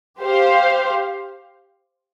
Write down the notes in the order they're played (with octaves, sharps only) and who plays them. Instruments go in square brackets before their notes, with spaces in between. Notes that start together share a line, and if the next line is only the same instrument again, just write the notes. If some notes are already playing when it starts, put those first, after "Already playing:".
[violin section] G4 C5 F5